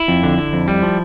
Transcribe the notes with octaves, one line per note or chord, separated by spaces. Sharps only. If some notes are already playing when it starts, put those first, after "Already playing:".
Already playing: E4
F2
D3
D3
F2
G3
F3